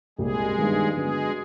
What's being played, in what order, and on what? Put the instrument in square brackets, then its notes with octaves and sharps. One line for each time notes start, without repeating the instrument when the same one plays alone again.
[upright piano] C2 A#2 G3 [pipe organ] G#3 G#4
[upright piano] G2 D#3 G3 B3
[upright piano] D3 F#3 B3 [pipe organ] G#3 G#4